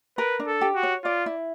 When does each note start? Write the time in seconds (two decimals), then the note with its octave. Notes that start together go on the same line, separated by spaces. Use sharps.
0.18 A#4 B4
0.40 D4
0.47 A4
0.61 G4
0.75 F#4
0.83 C#5
1.04 F4 D5
1.26 E4